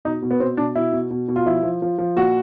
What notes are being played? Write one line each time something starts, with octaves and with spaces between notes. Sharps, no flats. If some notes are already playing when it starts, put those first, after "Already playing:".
B2 D#4
B2
B3
B2 C4
B2 D4
B2 E4
B2
B2
B2
F4
F3 E4
F3
F3
F3
A#2 F#4